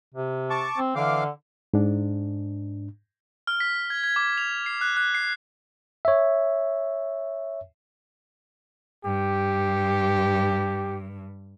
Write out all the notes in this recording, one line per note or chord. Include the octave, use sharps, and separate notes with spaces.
C3
A5 C#6 D6
C4
D3 E3 F5 D6
G#2 D4
F6
B6
G#6
G#6
D6
F7
C7
F#6
F#6
C7
C#5 E5
G2 G4